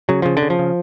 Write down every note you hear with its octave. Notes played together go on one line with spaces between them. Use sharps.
C#3 F#3
C#3 F3
D3
C#3
F3
C#3